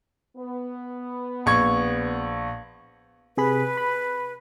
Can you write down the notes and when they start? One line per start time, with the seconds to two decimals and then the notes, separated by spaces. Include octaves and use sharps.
0.37 B3
1.46 A#1 C#6 G#6
3.37 C3 G#4 B4 B5
3.77 B5